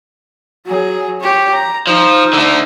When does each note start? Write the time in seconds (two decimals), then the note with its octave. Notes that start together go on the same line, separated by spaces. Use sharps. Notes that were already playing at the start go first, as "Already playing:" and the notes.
0.66 F#3 G#4
1.20 G4 C#5
1.54 A#5
1.87 F3 D#4
2.33 D3 A3